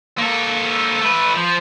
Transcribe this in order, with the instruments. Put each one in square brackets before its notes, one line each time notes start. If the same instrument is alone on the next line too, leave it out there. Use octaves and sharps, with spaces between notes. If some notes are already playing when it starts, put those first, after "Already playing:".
[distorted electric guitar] A#3 A4
A3 B4
F3